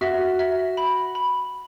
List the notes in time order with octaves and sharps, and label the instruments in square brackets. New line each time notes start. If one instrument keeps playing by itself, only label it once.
[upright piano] F#4 [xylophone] E5
[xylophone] E5
B5
B5